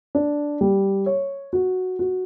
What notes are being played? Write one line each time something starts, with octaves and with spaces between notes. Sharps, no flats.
D4
G3
C#5
F#4
F#4